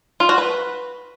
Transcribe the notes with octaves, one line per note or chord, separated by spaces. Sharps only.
F4
F#4
B4